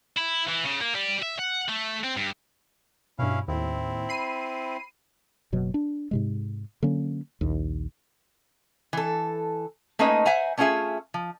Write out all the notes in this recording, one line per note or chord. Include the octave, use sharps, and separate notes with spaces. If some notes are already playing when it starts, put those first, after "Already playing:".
E4
E3
C#3
A#3
G3
E5
F#5
A3
C4
G2
G2 B2 C#4 E4 F5
D#2 A2 C4 E4
B5 C7 D#7
F#1 B2 F#3
D4
G#2 C3 G#3
D3 F#3 A#3 C#4
A#1 D#2
E3 A4
A3 A#3 C#4 D#4 B4 D#5
C5 E5 F#5 G#5 A#5
A3 C#4 D4 F4 G#4 E5
F3